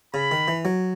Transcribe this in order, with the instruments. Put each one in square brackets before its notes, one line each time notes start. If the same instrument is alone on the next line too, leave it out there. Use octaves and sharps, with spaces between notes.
[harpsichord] C#3 [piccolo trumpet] B5
[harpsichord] D#3
E3
F#3